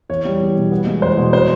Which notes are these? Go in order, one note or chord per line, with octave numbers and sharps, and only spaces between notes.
E2 C#5
G3
E2
B2
B3
G#3
E2 C5
B2
C5